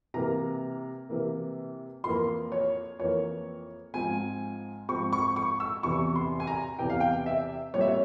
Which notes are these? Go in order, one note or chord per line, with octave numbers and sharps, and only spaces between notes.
C3 E3 A#3 A#5
C3 E3 A#3
F2 E3 A#3 C6
C#5
F2 E3 A#3 C#5
G#2 F3 C4 G#5
G#2 F3 C4 C#6
C#6
C#6
E6
E2 C3 E3 C#6
C6
G#5
A#5
E2 C3 E3 G5
F5
G5
E5
A#2 G3 C4 C#5
E5
C#5